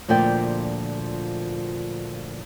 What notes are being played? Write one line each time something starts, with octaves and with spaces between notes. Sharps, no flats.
D2 A#2 F3 D5 G5